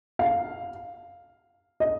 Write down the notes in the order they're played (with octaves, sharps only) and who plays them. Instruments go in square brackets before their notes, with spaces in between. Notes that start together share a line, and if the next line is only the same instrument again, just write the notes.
[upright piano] F5
D#5